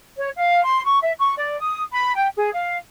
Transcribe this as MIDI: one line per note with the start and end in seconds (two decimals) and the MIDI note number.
0.18 0.29 73
0.36 0.63 77
0.64 0.83 84
0.85 0.99 85
1.01 1.12 76
1.19 1.34 85
1.37 1.59 74
1.60 1.81 87
1.92 2.15 83
2.16 2.28 79
2.36 2.50 68
2.53 2.77 77